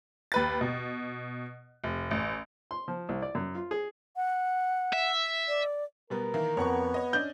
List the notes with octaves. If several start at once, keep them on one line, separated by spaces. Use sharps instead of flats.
D#2 B4 A6
B2
F1
A1
C6
F3
C2
D5
F#2
F4
G#4
F#5
E5
D5
B2 G3 B3 A#4
D#3 E3 A#3
F2 B3 C#5 F#5 C#6
C#5 D#5
C#4 D4 D#5 G6